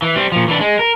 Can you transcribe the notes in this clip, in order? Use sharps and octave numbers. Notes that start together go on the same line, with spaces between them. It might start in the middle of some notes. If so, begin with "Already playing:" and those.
E3
G3 C4
A#2 F3
E3 D4
G#3
A#4